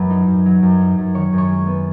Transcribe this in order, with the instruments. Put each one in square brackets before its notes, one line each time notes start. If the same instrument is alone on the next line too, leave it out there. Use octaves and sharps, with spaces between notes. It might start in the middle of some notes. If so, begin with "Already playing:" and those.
Already playing: [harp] F#2 F#3 B4 B5
D#4
F#2
F#3
F#2
D#4
F#2
D#3 C#5 C#6
F#2
C#5 C#6
G#3
B3